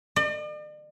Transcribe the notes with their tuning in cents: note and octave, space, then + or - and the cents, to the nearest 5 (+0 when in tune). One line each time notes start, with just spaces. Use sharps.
D5 +45